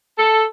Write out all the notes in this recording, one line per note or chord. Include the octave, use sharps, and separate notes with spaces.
A4